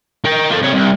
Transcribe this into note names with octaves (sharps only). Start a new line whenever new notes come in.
A#4 G5
F4 A4
C3 C#5
C2